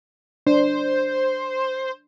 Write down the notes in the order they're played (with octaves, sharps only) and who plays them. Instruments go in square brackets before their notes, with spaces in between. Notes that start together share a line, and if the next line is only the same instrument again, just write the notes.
[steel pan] D4 [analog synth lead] C5